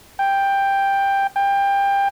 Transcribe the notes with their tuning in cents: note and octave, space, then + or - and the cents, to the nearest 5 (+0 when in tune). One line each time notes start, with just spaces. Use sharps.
G5 +10
G5 +25